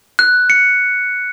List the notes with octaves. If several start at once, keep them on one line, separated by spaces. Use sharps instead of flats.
F#6
C#7